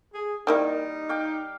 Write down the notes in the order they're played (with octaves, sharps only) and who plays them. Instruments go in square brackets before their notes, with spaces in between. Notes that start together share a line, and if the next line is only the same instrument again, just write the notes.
[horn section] G#4
[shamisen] D#3 A#3 E4 [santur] G3 [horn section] D#4
[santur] F5 G5 D6